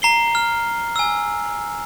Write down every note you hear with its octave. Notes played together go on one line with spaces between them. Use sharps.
A#5 C7 G7
F6
G#5 E6